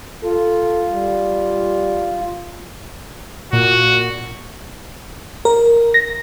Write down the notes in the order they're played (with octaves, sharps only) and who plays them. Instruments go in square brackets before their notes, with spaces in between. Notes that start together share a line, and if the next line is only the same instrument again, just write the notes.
[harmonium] F4 [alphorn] A4
[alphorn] G3
[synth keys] A#2 [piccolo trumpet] F#4
[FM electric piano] A#4
A#6